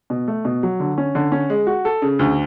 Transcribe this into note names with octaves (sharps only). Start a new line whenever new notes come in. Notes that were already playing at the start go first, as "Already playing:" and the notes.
B2
A3
B2
F#3
D3
C#4
D3
C#4
G#3
F#4
A4
C#3
D2